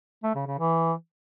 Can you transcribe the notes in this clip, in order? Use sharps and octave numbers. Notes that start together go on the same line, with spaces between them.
A3
C#3
C#3
E3